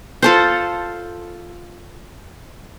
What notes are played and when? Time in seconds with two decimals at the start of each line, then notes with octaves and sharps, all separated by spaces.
0.22 F4 A4 C5